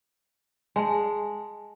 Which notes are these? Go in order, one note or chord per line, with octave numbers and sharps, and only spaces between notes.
G#3 G#5 A5